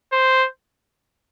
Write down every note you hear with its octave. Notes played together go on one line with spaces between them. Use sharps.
C5